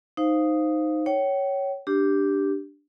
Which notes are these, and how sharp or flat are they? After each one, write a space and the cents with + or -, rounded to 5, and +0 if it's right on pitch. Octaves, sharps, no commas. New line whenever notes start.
D#4 +0 C5 +0 F5 +0
C#5 +0 G5 -40
D4 +0 G4 +0